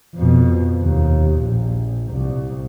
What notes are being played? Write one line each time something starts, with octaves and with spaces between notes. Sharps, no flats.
F2 B2
D#2
A#1
C2